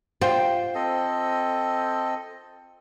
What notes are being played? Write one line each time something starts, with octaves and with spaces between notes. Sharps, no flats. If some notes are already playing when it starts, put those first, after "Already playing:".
F4 C5 G5
C4 A4 D#5